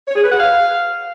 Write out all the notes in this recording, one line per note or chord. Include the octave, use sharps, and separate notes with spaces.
C#5
G#4
B4
F#5
F5